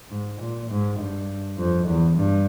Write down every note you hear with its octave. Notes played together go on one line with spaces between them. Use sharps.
G#2
A#2
G#2
G2
F2
E2
G2